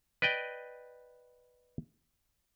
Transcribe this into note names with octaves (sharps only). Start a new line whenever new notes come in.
B4 D5 D#5 G5